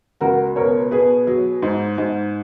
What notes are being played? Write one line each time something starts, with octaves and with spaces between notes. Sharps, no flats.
C#2 F#4 A#4
B2 A#4 C#5
B2 G#4 B4
F#3
G#2
G#2